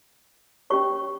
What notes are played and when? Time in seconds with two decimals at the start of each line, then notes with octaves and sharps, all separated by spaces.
0.70 C#4 G4 C#5 C#6